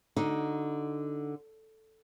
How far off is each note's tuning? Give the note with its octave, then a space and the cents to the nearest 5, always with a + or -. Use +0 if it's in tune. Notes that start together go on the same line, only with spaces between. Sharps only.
D3 +0 D#4 +0 F#4 +15